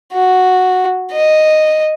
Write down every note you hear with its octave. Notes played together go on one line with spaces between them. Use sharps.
F#4
D#5